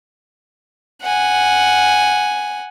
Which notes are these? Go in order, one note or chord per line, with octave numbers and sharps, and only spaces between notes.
F#5 G#5